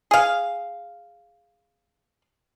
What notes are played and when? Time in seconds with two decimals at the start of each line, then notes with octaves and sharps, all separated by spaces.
0.11 G#4 F5